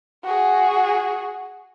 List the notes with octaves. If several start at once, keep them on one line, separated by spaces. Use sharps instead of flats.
F#4 G#4